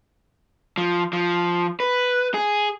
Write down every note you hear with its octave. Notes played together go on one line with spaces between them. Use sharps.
F3
F3
B4
G#4